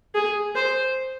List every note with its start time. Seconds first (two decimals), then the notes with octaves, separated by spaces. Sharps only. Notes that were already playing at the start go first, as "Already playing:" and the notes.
0.15 G#4
0.56 C5